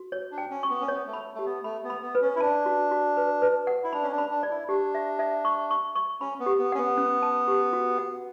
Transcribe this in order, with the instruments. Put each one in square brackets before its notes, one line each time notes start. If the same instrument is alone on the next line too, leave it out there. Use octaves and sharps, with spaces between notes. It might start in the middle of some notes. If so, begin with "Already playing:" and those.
Already playing: [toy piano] F#4
C#5
[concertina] D4
[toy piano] G5
[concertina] C#4
[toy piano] C#6
[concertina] B3
C#4
[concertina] B3 [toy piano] C#5
[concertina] A3
[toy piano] B5
[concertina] A3 [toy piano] G4
[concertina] B3
[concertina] A3 [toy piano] B5
[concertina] B3
[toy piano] B5
[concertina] B3
[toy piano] B4
[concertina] C#4
E4
[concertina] D4 [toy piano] A5
[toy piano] F#4
F#4
B4
B4
F#5
[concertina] E4
[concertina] D4 [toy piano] B5
[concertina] C#4
D4
[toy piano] B5
[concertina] D4
[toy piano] D5
[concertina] E4
[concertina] D4 [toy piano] G4
[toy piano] E5
E5
C#6
C#6
C#6
[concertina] C#4 [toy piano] B5
[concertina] B3
[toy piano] G4
[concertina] B3
[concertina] C#4 [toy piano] F#5
[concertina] B3
[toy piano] C#4
A5
G4
F#4
F#5